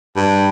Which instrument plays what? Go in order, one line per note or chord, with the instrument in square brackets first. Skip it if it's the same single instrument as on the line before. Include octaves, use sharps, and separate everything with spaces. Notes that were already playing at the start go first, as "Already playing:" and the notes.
[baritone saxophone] G2